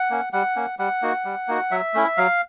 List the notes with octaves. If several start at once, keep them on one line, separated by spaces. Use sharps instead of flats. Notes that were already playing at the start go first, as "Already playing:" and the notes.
Already playing: F#5
A#3 C#4
G3 F#5
A#3 C#4
G3 F#5
A#3 D#4 F#4
G3
A#3 D#4 F#4
F#3 E5
A3 C#4 E4
F#3 F5